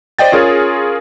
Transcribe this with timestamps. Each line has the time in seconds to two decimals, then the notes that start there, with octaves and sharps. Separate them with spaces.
0.19 C5 D5 D#5 G5 A6
0.32 C#4 F4 G#4 A#4 C#5